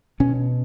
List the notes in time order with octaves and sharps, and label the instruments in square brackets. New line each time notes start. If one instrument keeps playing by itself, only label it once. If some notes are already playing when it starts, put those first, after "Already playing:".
[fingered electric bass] B2 C#4